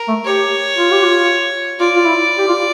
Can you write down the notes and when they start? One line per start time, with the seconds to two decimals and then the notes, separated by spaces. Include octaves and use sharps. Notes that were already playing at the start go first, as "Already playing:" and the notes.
Already playing: A#4
0.08 A3
0.25 G4 C#5
0.78 F4
0.91 G4
1.05 F4
1.80 F4 D5
1.96 F4
2.05 E4
2.38 G4
2.48 F4